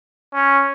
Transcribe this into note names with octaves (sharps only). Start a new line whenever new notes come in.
C#4